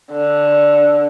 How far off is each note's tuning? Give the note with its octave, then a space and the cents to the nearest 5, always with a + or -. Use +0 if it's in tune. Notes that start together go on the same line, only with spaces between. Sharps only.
D3 +0